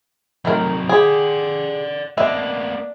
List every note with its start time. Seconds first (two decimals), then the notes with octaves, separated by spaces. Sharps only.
0.45 C3 D#3 F#3 A3 A#4
0.89 G4 G#4 D5 F#5
2.17 A#3 B3 D4 D#5 E5